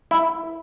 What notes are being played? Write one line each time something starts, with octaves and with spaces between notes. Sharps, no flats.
E4